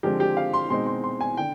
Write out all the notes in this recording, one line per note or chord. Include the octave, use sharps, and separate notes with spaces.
D3 F3 G#3 C4 G4
G4
F5
C6
B2 G#3 C4 D#4 C6
C6
C6
G#5
D3 G5